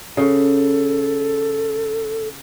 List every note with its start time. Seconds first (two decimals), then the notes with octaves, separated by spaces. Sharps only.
0.17 C#3 A4